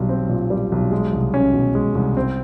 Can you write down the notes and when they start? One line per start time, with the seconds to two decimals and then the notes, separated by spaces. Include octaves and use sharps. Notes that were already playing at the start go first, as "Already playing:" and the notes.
Already playing: B1 G3
0.09 C4
0.29 A#2
0.50 G3
0.72 B1
0.91 G#3
1.13 C2
1.34 C#4
1.53 B2
1.75 G#3
1.95 C2
2.17 C4